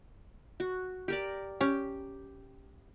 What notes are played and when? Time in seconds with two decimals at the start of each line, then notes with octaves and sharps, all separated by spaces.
0.60 F#4
1.08 G4 A#4 D5
1.61 C#4 G4